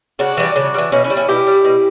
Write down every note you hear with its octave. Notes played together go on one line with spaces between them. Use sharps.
C#3 D4 F#4
E3 G3
C#3
G3
E3
B2 C#4 E4
C#4 E4
G3
C#4 E4
B2 E4 G4
G3
B2